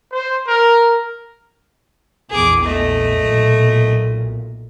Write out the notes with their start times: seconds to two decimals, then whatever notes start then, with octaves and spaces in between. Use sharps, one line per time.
0.11 C5
0.46 A#4
2.31 A#1 E2 G#4 D6
2.64 A3 D#5
3.20 B1 A#2